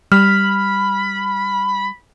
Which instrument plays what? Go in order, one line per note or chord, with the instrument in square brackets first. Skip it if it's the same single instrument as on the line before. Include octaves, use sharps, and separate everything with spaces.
[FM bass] G3 [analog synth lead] B5 [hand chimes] F6